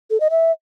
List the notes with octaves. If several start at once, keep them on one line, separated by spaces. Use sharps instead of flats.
A4
D#5
E5